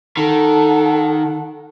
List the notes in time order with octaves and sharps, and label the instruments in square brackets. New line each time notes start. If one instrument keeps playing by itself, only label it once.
[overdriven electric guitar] D#3 [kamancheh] A4 F#5